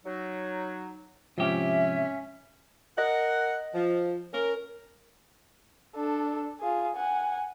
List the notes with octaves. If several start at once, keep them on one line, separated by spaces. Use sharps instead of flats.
F#3 D#4
G#2 C3 F3 C#4 G4 E5
A#4 D#5 F#5
F3
C#4 A#4
D4 A4
F4 G#4
F#5 G#5